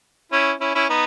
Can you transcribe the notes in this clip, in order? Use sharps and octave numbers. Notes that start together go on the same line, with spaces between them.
C#4 E4
C#4 E4
C#4 E4
B3 D#4